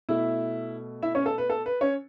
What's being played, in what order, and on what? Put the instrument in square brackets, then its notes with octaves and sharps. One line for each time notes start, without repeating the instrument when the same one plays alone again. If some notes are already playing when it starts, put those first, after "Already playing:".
[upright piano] B2 A3 E4 E5
E4 E5
C#4 C#5
A4
B4
A4
B4
C#4 C#5